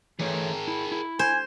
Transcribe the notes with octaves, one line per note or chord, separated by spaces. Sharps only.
E3 A3 G#4 A#4 C#5
E4
E4
C5 G#5